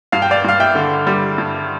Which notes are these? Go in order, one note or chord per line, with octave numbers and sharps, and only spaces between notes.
G2 F5
G5
D5 F5
G2 F5
E5 G5
D3
G3
G2